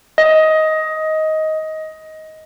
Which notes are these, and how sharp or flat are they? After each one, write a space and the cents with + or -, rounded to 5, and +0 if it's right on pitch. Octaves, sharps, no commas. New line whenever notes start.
D#5 +15